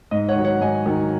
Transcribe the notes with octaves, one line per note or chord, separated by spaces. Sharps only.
G#2 D#5
C#5 F#5
D#3 F#3
C#5 F#5
G#2 D#5 G#5
D#3 F#3